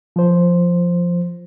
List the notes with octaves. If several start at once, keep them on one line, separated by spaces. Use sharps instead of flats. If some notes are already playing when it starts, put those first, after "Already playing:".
F3 C5